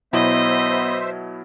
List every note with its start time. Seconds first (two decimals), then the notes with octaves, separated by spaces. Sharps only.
0.13 B2 F#3 B3 E4 C5 D#5 E5